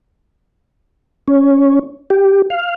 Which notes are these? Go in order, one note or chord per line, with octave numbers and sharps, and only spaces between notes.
C#4
G4
F5